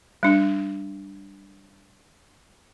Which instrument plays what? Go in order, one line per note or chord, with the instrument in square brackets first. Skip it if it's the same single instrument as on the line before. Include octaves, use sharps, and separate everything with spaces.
[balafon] G3 D4